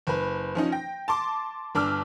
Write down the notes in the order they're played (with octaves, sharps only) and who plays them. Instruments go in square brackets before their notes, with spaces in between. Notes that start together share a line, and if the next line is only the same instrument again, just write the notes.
[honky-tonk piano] F#1 B4
F3 C#4 D#4
G5 A#6
A5 C6 D6
G1 D4 D6 E6 F6